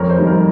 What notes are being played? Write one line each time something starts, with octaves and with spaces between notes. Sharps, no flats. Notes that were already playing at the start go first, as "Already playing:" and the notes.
Already playing: F2 A#4 C#5
C5
D#3 G3
A#4